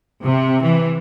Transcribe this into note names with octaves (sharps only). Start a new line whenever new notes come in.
C3
E3